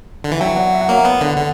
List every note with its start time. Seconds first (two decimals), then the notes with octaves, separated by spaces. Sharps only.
0.24 D3
0.32 E3
0.40 F#3 E5 G5
0.56 D5 F#5
0.73 E5
0.81 F#5
0.89 A#3 C#5 E5
1.05 B3
1.21 D3
1.37 D3